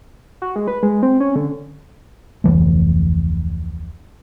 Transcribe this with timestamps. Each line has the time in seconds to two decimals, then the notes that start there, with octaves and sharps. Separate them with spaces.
0.42 F#4
0.56 G#3
0.67 B4
0.83 G#3
1.03 C4
1.20 C#4
1.36 D3
2.44 F1 D2 E3 A3